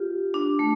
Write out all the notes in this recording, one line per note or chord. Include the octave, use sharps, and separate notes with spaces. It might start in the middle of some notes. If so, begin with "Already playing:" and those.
Already playing: F4 G4
D4
A3